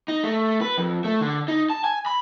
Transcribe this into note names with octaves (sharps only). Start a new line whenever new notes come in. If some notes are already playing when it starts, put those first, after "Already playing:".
D#4
A3
B4
F2
A3
D3
D#4
A5
G#5
B5